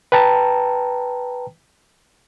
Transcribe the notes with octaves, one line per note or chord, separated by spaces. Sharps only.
B4 G5 A5 A#5